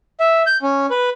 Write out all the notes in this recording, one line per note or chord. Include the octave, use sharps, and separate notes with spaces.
E5
G6
C#4
B4